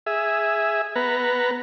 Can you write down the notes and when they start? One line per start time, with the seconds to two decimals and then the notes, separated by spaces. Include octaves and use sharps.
0.06 G#4 E5
0.95 B3 B4 A#5